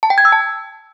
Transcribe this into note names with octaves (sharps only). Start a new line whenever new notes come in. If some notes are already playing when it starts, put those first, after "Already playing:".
A5
G5
G#6
E6
A5